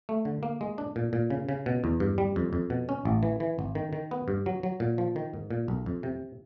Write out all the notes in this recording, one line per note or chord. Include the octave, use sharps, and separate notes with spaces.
A3
D3
A#3
G#3
D4
A#2
A#2
C#3
C#3
B2
E2
G2
G3
F2
F2
B2
C#4
A1
E3
E3
G#1
D#3
D#3
B3
G2
F#3
F#3
A#2
F3
D#3
G#2
A#2
B1
F2
C3